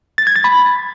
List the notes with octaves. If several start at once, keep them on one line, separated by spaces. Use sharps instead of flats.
A6
G#6
A6
B5